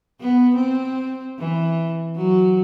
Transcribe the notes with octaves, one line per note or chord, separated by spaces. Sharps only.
B3
C4
E3
F#3